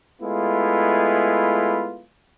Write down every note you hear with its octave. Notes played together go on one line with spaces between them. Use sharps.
G#3 A3 B3 E4 F4